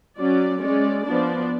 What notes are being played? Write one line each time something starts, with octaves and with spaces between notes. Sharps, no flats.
F#3 C#4 D5
G#3 C#4 D5
F3 B3 D4 D5